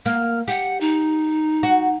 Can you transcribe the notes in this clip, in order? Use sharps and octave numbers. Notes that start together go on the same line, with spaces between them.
A#3 F6
G4 F#5
D#4
F#4